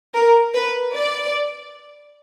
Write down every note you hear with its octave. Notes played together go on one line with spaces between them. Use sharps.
A#4
B4
D5